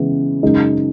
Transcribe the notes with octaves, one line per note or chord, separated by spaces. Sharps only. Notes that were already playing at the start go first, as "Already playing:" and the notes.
Already playing: C#3 E3 G#3 B3
F#2 C#3 G#3 D#4